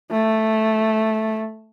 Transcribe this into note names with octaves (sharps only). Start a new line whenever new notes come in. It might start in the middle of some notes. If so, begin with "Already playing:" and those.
A3